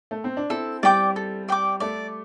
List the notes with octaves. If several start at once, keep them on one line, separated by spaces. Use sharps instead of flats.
A3
C4
D4
C4 E4 A4
G3 D5 G5 D6
A4
D5 G5 D6
A3 D5